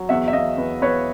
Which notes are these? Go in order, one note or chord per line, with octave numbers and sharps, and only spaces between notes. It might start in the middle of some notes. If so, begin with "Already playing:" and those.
Already playing: F#3
E2 E5 F#5
E5
E2 D#5 F5
E2 B4
E2 B4 C#5